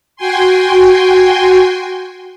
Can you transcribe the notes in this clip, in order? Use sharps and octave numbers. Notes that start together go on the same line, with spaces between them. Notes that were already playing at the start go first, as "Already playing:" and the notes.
F#4 G5 G#5 C6